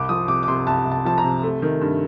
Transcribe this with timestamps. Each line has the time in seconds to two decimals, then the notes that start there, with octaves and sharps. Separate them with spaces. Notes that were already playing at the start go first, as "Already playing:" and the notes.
Already playing: C2 D6
0.09 F3 D#6
0.28 C3 D6
0.43 D6
0.48 C3 C6
0.67 C2 A5
0.85 C2
0.92 A5
1.05 F3 A5
1.18 A#5
1.24 C3
1.43 A3
1.62 D#3
1.81 G2